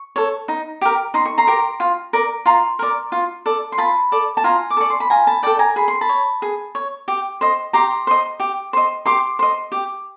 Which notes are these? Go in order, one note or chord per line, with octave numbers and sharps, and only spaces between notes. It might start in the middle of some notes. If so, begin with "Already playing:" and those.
Already playing: C#6
A4 C#5
D#4
G4 A#4
D#4 C6
C#6
A#5 C6
G4 A#4
F4
A#4 D5
F4 A#5 C6
A#4 D5
F4
A4 D5
C6
F4 A5 B5
A4 D5
A5
F4 G#5 A#5
D6
A4 D5 C#6
C6
B5
F4 G#5 A#5
A5 B5
A4 D5 G5 A5
G#5 A#5
G#4 B5
C6
A5 B5
C#5
G#4
C#5
G4
C5 D#5
G4 A#5 C6
C5 D#5
G4
C5 D#5
G4 C6 D6
C5 D#5
G4